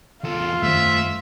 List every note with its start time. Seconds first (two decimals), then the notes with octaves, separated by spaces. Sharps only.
0.24 E2 F4 A4
0.63 F#2 D#3 G3 A3 C5 E5